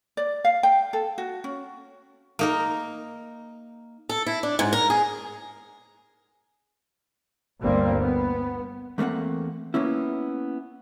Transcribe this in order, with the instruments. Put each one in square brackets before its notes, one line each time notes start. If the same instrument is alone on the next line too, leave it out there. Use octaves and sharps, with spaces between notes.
[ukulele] D5
F5
G5
A4
F#4
C#4
[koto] A#3 D#4 A#4
[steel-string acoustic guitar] A4
E4
D4
G#2
A#4
G#4
[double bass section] G1 D2 G3 A#3 C4
B3
[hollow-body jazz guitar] E2 A3 A#3 C4 F#5
A#3 B3 C#4 E4